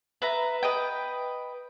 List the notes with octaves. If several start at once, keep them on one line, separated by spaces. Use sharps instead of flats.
B4 E5 A#5
B4 D#5 G5